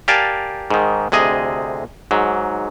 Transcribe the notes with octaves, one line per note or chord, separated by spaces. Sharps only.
G4 A#4 D5 F5 G#5 A5
G#2 D#3
D2 C3 G#4 D#5
G#2 F#3